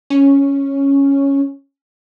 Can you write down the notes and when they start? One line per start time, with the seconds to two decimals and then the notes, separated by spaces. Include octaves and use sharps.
0.10 C#4